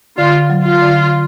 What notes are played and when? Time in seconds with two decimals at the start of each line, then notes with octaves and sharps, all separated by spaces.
0.18 D3 F4
0.50 F#3
0.65 F4
0.81 D3